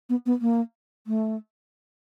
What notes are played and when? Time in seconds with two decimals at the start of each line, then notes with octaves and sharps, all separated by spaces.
0.09 B3
0.26 B3
0.41 A#3
1.07 A3